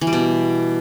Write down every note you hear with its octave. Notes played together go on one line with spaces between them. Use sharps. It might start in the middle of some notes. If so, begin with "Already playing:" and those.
E3
G3
B2